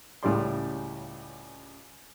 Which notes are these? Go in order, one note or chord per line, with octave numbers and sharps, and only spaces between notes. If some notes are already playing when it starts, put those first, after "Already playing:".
C#2 A2 C#3 G3 D5 C6